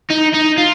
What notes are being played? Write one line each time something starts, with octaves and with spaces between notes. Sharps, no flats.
D#4
D#4
F4